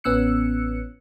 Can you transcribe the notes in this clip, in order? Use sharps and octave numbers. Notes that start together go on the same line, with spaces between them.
A1 B3 C#4 E6 F#6 C#7